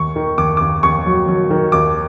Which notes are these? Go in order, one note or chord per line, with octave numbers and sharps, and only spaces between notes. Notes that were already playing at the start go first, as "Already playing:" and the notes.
Already playing: D#2 C#6
D#3
D#2 D6
D#2 D6
D#2 C#6
F#3
F#3
D#3
D#2 D6